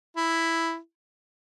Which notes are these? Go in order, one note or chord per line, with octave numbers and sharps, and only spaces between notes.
E4